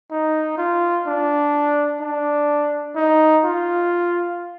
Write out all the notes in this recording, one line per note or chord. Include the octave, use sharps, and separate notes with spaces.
D#4
F4
D4
D4
D#4
F4